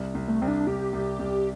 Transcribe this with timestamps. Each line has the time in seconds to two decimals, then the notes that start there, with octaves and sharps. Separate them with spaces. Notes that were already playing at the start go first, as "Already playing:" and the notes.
Already playing: C2
0.15 C2
0.28 A3
0.42 C2 C4
0.48 D4
0.67 C2 G4
0.93 C2
1.19 C2